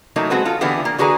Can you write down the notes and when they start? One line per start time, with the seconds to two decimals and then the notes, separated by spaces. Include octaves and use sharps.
0.16 E3 F#3 A3 A#3 D#4
0.30 G#3 C4 F#4 A4 B4
0.45 F4 A4
0.61 D3 E3 B3 E4 F4 G4
0.85 A#3
0.99 D3 F#4 G#4 B4 A5 A#5